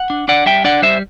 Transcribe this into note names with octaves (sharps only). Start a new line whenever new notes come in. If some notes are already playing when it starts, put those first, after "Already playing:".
Already playing: F#5
D4
D4 D5 F#5
G3 E5 G5
D4 D5 F#5
G3 C5 E5